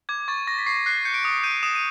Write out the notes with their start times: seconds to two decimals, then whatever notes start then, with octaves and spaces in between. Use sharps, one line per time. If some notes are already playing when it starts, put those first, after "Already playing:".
0.09 D6 G#6
0.28 C#6 A6
0.47 C#6 A#6
0.59 B6
0.66 C#6 C7
0.86 F#6 C7
1.05 G6 C#7
1.14 D7
1.23 D#6 C#7
1.38 D7
1.44 G6 D#7
1.63 D#6 E7
1.75 D#7